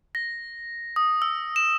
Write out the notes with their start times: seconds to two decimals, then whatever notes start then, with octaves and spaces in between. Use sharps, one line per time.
0.15 A#6
0.96 D#6
1.22 E6
1.56 E7